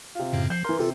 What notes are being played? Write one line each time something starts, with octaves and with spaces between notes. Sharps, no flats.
C3 F4
F#2 A2 C#3
F3 G6 C7
E3 A#4 C6
C3 F4 A4